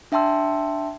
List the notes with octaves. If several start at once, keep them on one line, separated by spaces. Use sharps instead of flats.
D4 E5 G5 A5 C6 E6